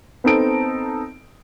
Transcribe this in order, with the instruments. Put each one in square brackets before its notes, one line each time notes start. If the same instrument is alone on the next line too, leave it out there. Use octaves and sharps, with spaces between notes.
[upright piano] B3 C4 D#4 A4 D7